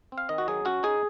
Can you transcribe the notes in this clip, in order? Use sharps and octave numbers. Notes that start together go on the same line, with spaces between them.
C4
F5
D#3 D#5
F#4
F#3 G#4
C#4 F#4
D#4 G#4